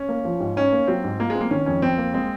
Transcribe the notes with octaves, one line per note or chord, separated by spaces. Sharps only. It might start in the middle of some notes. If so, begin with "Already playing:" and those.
Already playing: C#4
A#3
F3
G#2
C#4 D#4
A#3
F#3 C4
G#2
A#3 F4
G#3
C4
A#3
D#3 C#4
F2 C#4
F2 C4
A#3
G#3 C4